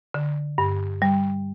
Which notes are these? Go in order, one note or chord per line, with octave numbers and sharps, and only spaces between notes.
D3
G2
G3